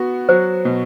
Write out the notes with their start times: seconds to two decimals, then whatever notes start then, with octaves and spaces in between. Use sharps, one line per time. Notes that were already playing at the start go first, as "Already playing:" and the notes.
Already playing: B3 F#4
0.29 F#3 C5
0.65 B2